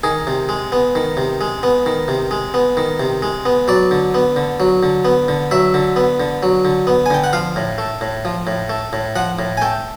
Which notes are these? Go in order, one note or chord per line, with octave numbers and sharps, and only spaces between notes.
D#3 G#4
C3
G#3
B3
D#3
C3
G#3
B3
D#3
C3
G#3
B3
D#3
C3
G#3
B3
F#3 D5
D3
B3
D3
F#3
D3
B3
D3
F#3 E5
D3
B3
D3
F#3
D3
B3
G#5
D3 G5
F#5
F3 F5
A2
A3
A2
F3
A2
A3
A2
F3 F#5
A2
G#5
A3 G5